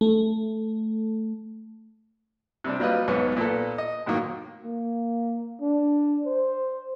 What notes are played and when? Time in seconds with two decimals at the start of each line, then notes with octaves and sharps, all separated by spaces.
0.01 A3
2.64 C3 G3 D4
2.79 F#3 G3 A#3 F4 B4 D#5
3.08 B1 G#2 B3 B4 C#5
3.36 A#2 A#3 B3 A4
3.78 D#5
4.06 F#2 A2 D#3 F#3 A#3
4.64 A#3
5.61 D4
6.26 C5